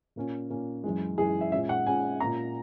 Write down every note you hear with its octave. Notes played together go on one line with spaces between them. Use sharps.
A#2 A#3 C#4
A#2 A#3 C#4
F#2 E3 G#3
F#2 E3 G#3 G#4
E5
A#2 G#3 C#4 E5
F#5
A#2 G#3 C#4 G#5
A#2 A#3 C#4 A#5